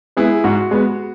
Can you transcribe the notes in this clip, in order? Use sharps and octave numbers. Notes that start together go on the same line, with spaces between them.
G#3 B3 E4 G#4
G#2 F#4
G#3 B3